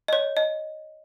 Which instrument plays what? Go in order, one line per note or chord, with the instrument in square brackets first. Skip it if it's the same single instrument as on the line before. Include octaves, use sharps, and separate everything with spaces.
[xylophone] D#5
C#5
D#5